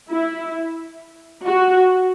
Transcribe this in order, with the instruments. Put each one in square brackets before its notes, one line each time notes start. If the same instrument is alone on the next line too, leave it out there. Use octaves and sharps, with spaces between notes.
[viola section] E4
F#4